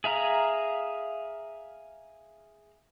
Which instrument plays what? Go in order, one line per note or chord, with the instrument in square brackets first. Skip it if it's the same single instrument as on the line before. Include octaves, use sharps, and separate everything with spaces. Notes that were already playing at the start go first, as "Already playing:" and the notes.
[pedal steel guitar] G#4 E5 F5 A#5